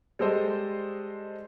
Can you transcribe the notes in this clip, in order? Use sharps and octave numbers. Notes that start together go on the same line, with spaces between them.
G3 G#3 A4 C5 D#5